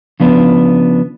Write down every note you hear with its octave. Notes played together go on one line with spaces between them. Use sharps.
C#3 F3 B3 D4